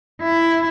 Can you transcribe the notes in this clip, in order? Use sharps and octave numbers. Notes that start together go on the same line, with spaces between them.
E4